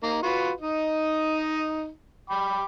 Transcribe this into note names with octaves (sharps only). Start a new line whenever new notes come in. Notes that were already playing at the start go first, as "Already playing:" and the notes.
A#3 D#4
F4 F#4 B4
D#4 D#5
G5 B5 D6